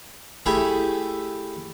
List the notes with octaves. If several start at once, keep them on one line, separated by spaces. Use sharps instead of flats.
A3 E4 G4 G#4